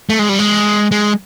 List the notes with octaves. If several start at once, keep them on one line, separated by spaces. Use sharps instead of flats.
A3
G#3
G3
G#3
G#3